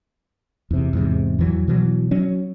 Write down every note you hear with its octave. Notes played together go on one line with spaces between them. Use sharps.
E2 C3
E2 G#2 C3
E2 E3 F#3
B2 E3 F#3
F#3 C#4